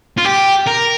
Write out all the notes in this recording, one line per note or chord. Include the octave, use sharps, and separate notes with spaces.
F4
G4
A#4